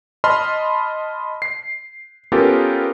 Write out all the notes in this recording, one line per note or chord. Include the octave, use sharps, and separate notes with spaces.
D#5 A5 B5 C6 F6
C7
B3 C#4 F4 G4 A4 A#4